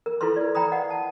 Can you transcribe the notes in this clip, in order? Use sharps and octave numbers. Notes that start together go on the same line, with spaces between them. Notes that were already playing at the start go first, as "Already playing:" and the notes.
A#4
E4 F4 A4 B4 C6
B4 D5
G5 A#5 B5 D#6
D#5 F5 F#5
A5